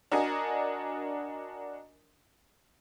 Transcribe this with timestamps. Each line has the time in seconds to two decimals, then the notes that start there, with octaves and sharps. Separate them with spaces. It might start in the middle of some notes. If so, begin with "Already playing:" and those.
0.12 D4 F#4 A#4 D#5 G#5